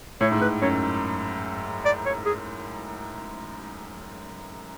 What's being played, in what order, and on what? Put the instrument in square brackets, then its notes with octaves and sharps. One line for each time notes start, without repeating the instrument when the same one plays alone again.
[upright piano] A2 [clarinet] C#5
[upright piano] G#2
[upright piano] A2 [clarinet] B4
[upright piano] F#2 [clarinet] C#5
[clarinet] D5
C#5
G#4